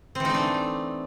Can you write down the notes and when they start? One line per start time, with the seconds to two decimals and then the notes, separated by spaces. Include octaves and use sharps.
0.15 C4
0.20 E3
0.25 D#4
0.30 A3
0.34 D4